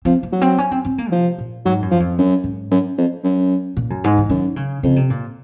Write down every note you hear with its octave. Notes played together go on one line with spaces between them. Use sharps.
F3 C4
A#3
F#3
C4
C#4
C4
C4
A#3
C3 F3
A#2
G#2 F#3
F#2
F3
F2
F#2
G#2
F#2
F2
F#2
A#2
F#2
G#2
D#3
F#2 D#3
C#3
F2 C#3
C3
A#2